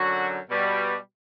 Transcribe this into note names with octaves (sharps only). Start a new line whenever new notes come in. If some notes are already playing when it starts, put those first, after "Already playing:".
Already playing: F#2 D3 F#3 F#4
B2 G3